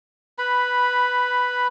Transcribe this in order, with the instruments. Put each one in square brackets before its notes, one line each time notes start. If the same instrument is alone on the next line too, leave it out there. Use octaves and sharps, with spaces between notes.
[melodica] B4 B5